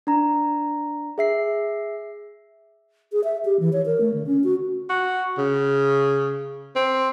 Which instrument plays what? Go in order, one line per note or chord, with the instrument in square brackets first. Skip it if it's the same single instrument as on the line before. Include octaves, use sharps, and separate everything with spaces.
[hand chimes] D4 A#5
G#4 E5 C7
[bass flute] G#4
E5
G4
E3
C#5
A#4
A3
D3
C#4
F#4
[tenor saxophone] F#4
C#3
C4